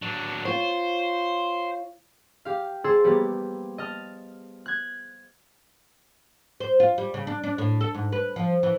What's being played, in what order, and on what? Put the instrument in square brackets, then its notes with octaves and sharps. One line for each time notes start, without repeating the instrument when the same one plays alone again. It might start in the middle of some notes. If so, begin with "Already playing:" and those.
[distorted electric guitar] F#3 D4
[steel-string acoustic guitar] F4 C#5 [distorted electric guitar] C5
[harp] G4 F5
G#4 A4 C5 E6
G3 A#3 B3 G4
D#5 A5 F6
F#6 G#6
[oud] C5
F4
G3
C#3
D4
D4
A2
A4
G#2
B4
F3
E3